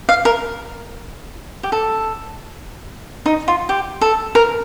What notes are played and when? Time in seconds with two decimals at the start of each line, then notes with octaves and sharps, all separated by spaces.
0.09 F5
0.25 A#4
1.63 G4
1.72 A4
3.26 D#4
3.48 F4
3.69 G4
4.01 A4
4.35 A#4